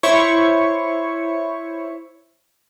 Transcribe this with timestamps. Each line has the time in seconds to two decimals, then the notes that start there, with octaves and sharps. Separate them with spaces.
0.03 E4 C5 C#5 C#6